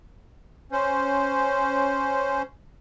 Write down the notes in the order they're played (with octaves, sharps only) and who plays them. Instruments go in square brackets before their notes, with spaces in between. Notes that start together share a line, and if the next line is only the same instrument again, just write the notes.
[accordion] C#4 C5